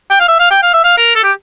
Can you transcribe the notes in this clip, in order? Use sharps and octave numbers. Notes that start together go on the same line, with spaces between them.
G5
F5
E5
F5
G5
F5
E5
F5
A#4
A4
G4